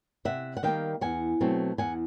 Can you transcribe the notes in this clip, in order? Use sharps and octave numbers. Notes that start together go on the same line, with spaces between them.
C3 E5 F#5
F#5
D#3 G3 A#3 F5 G5
E2 F#5 G#5
B2 F#3 A3 C4
E2 F#5 G#5